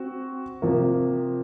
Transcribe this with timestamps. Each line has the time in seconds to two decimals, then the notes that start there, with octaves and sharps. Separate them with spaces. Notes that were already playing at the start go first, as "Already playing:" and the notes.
Already playing: C4 F#4
0.62 C3 F3 A#3